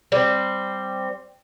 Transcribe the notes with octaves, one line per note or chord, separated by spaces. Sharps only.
G3 C4